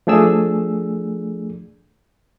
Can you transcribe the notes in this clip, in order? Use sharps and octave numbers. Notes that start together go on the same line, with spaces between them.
F3 A3 D4 G#4 E6